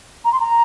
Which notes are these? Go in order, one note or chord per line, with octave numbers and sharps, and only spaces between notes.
A#5
C6
A#5